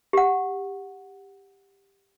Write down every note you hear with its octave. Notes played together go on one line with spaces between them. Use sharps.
G4 F#5